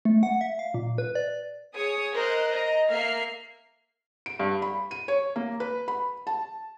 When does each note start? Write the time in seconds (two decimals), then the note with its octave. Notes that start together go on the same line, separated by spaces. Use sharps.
0.05 A3
0.23 F#5
0.41 E5
0.59 F5
0.74 A#2
0.98 B4
1.15 D5
1.74 G#4 C#5 D#6
2.14 A#4 C5 D#5 F#6
2.53 D#5 A#5
2.89 A#3 E5 F6 C7
4.26 D7
4.40 G2
4.62 B5
4.91 D#7
5.08 C#5
5.36 A#3
5.60 B4
5.88 B5
6.27 A5